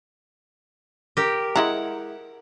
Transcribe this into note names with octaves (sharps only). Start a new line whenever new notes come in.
G4 A#4
G#3 E4 F#5 A#5